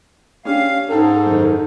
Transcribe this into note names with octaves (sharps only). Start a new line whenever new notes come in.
C#4 D4 G4 F5
G#2 D#4 A4 G5 A5
F#2 D#3